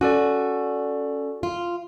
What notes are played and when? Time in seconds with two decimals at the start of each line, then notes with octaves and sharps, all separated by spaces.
0.01 C#4 F#4 A4 D5
1.43 F4